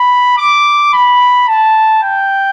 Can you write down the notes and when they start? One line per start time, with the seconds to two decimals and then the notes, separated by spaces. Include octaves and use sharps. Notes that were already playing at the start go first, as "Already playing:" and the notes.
Already playing: B5
0.38 D6
0.93 B5
1.48 A5
2.03 G5